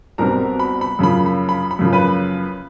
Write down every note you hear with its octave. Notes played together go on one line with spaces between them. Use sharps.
C2 B2 G3 C4 A#4 A#5
B5
B5
F#2 C#3 F3 A#3 B5
B5
B5
B5
F#2 C#3 F3 A#3
B4 B5